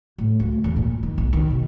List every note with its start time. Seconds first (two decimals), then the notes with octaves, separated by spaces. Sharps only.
0.18 A2
0.40 D2
0.64 E2
0.76 A#2
1.03 D#3
1.18 B1
1.33 D#3
1.50 B2